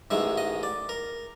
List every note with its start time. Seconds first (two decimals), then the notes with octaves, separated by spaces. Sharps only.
0.11 A1 G#2 D#3 G#3 E5
0.37 D#5
0.63 D5
0.89 A#4